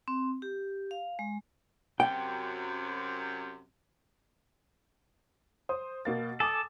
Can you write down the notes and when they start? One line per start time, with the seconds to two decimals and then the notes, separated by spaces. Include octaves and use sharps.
0.08 C4
0.42 G4
0.91 F5
1.19 G#3
2.00 F#2 C3 G5
5.69 C5 D#6
6.05 B2 A#3 A6
6.40 A4 G#5 D6 D#6